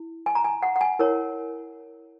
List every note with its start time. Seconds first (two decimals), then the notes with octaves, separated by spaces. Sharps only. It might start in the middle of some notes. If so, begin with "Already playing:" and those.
Already playing: E4
0.26 G#5
0.35 A#5
0.44 G#5
0.63 F#5
0.76 F#5
0.81 G#5
0.99 E4 A#4 C#5